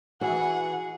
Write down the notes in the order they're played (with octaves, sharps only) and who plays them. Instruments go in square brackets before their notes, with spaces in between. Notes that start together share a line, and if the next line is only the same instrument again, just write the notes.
[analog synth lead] E3 [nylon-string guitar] F#4 [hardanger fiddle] G#4 [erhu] F#5